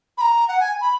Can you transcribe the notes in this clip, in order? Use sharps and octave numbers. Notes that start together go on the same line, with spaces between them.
B5
A#5
F#5
G#5
B5